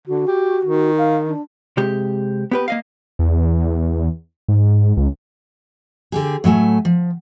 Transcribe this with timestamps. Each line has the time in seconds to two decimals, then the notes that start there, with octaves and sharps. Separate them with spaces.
0.07 D3 F#4
0.27 G4
0.65 D#3
0.98 F5
1.27 D4
1.77 C3 G#3 G4
2.51 B3 G4 B4
2.68 A#3 D#5 F5
3.19 E2
4.48 G#2
4.97 C#2
6.12 D3 G4 G#4
6.44 A2 F#3 A3 G#5
6.85 F3